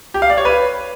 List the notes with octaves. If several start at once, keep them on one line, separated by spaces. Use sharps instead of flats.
G4
F5
D5
C#5
B4